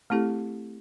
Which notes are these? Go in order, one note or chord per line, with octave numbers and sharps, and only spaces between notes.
A3 C4 E4 G4 A4